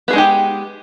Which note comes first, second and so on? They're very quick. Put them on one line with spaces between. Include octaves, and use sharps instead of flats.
B3 G#4 G#3 D#4 G4